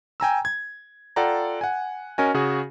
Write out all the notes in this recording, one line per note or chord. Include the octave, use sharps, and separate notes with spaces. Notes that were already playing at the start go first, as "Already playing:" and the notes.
G5 G#5 A#5 E6
G#6
F4 A4 D5 F#5 G5 A#5
F#5 G#5
C#4 F#4 A#4 D#5 G#5
C#3 F#4 G#4